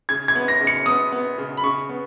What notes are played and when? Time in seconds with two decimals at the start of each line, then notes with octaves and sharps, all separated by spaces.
0.09 C#3 G#6
0.28 G#6
0.35 B3
0.48 A#6
0.61 C#3
0.67 C#7
0.86 B3 D#6
1.12 B3
1.38 C#3
1.57 B5
1.64 C#3 C#6
1.89 B3